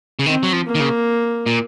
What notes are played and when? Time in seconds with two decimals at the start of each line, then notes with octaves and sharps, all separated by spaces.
0.19 C#3
0.26 D#3 C4
0.43 F#3
0.53 F3
0.67 A#3
0.75 D#3
0.80 C#3
1.46 A#2